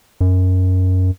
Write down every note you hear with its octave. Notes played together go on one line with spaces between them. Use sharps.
F#2